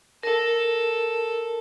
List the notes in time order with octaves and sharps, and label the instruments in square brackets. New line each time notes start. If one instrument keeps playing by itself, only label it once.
[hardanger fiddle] A4 [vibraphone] A#4